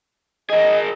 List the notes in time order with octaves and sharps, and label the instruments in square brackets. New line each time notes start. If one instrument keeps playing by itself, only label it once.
[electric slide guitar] G#4 A#4 [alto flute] D#5